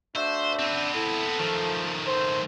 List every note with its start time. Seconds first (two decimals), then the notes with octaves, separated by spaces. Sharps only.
0.16 A3 D4 F#4 C5 E5
0.59 B3 C4
0.95 E4 A4
1.38 D#3 F3 A3
2.07 C5